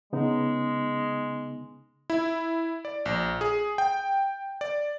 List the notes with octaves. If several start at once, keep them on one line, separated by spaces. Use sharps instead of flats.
C#3 G#3 B3 D#4
E4
D5
A#1
G#4
G5
D5